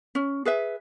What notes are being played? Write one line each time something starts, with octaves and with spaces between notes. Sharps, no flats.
C#4
G#4 B4 E5